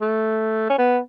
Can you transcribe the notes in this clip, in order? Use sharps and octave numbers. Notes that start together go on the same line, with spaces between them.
A3
C#4
B3